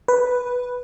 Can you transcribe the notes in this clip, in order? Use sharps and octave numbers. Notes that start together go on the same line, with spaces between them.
B4